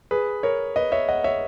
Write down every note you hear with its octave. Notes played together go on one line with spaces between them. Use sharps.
G#4 B4
A#4 C#5
B4 D#5
C#5 E5
D#5 F#5
C#5 E5